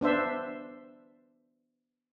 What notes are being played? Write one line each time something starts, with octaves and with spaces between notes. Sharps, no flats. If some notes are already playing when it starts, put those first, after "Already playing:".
B3 D4 C5 E5